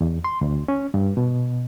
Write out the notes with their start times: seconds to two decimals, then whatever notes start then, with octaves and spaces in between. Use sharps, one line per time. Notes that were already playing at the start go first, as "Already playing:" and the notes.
0.01 E2
0.24 C6
0.41 D2
0.68 C#4
0.94 G2
1.17 B2